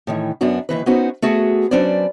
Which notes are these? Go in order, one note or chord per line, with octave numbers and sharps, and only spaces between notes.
A2 D#3 E3
F#2 B3 D4 F#4
D#2 A#2 E3 B4
B3 C#4 D#4 F#4 B4 C5
A3 B3 F#4 G#4
F#3 C#4 D4 B4 C5 D5